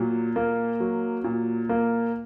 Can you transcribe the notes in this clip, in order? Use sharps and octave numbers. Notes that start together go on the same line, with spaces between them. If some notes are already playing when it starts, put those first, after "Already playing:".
Already playing: A#2 F#3
A#3
F#3
A#2
A#3